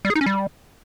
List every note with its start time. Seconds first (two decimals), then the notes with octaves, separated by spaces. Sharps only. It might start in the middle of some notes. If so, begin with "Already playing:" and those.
0.05 G3
0.10 G#4
0.15 D#4
0.21 C#4
0.26 G3